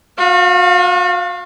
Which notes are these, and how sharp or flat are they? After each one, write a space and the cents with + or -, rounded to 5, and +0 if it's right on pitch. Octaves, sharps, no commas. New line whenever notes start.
F#4 -40 F5 +0